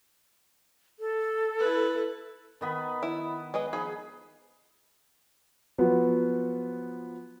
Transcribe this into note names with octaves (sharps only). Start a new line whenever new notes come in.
A4
E4 B4
D#3 B3 B5
E4
G#3 B4 D#5
F3 D#4 G#4 B5
F3 F#3 B3